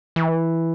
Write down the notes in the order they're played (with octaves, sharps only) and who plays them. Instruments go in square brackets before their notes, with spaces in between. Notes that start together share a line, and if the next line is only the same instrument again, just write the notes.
[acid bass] E3